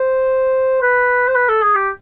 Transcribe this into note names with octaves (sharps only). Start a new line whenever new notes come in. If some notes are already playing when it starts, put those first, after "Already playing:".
Already playing: C5
B4
C5
B4
A4
G#4
G4